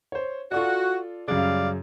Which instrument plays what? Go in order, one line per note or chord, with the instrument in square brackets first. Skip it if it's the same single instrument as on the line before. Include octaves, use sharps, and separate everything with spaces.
[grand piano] C5 C#5
[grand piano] F4 A4 D5 [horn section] F#4
[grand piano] F#2 C#3 [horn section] G3 D5 F5